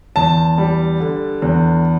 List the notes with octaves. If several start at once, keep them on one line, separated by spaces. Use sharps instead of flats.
E2 A5
G3
D3
E2